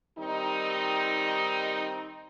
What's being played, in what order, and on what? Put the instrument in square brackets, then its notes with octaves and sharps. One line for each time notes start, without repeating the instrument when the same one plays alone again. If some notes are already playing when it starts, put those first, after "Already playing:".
[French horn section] D#3 G3 C4 D#4